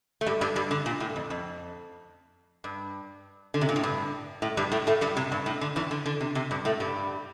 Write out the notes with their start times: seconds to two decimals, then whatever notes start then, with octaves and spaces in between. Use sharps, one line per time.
0.21 A3
0.26 G2 G3
0.41 G2 G3
0.56 G2 G3
0.71 D3
0.86 A#2
1.00 A2
1.16 F2
1.30 F2
2.64 G2
3.54 D3
3.61 C3
3.69 A#2
3.76 A2
3.83 G2
4.42 A2
4.57 G2 G3
4.72 A2 A3
4.87 A2 A3
5.01 G2 G3
5.17 C3
5.32 G2
5.46 A2
5.61 D3
5.76 E2 E3
5.91 D3
6.06 D3
6.21 C3
6.35 C3
6.51 G2 G3
6.65 A2 A3
6.80 G2 G3